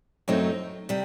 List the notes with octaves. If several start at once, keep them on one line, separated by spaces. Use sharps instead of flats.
F#2 F#3 A3 C4 D#4
C3 G3